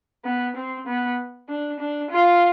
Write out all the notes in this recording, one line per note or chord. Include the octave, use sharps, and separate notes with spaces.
B3
C4
B3
D4
D4
F4